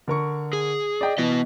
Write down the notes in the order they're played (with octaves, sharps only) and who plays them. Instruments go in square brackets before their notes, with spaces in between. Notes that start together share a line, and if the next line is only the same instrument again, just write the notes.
[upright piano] D3 A#4 C#6
[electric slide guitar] G#4
[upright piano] D5 D#5 G5
[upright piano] E3 [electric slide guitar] B3 D#5